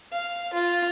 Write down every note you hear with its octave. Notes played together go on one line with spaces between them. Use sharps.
F5
F4